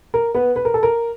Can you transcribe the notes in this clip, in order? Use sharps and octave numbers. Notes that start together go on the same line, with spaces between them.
A#4
B3 B4
B4
A#4
A4
A#4